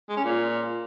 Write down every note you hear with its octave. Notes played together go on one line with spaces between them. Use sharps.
G#3
C#4
A#2